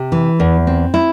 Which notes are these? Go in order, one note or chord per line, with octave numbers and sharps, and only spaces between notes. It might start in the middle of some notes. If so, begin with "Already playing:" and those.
Already playing: C3
E3
E2
C4
E4